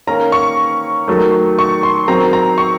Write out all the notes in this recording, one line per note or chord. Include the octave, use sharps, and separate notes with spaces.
D#3 A#3 C#4 A#5
C#6
D#3 F#3 A3
C#6
C6
D#3 F#3 C4 A#5
A#5
C#6